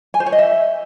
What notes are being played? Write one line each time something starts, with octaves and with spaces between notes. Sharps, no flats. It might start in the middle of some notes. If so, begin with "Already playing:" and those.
G#5
C5
C#5
D#5
E5